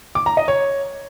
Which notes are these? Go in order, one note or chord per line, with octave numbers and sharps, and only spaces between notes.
D6
A#5
D#5
C#5